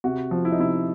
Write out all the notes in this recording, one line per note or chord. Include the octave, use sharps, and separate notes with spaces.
C3 F#4
F3
E4
D#4
C3 E4